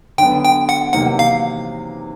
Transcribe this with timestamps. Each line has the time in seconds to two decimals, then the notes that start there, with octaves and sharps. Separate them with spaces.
0.18 D3 F#3 B3 G5
0.44 G5
0.69 F#5
0.93 E2 C3 D#3 F#3 A#3 F#5
1.19 F5